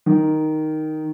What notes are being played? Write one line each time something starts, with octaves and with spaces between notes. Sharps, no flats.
D#3